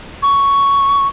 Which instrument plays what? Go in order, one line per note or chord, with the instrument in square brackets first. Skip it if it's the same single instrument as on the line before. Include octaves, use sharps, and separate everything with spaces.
[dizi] C#6